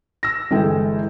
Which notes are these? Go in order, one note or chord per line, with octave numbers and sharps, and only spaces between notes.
E6 A#6
G1 E3 G#3 A4 G5